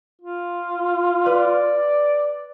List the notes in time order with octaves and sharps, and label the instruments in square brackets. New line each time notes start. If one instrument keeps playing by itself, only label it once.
[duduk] F4
[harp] B4 [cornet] D5